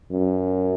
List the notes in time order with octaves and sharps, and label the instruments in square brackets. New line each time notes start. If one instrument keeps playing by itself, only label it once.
[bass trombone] F#2